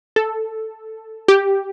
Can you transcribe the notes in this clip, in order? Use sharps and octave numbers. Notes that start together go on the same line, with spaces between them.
A4
G4